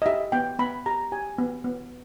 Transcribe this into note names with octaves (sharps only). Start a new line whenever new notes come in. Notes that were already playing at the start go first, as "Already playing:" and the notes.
D#5
G4 E5
B3 G5
B3 B5
G4 A#5
G4 G#5
B3
B3